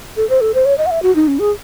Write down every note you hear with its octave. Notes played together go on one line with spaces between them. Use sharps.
A4
C5
A4
C5
C#5
D#5
F#5
E5
F#4
D#4
C#4
G#4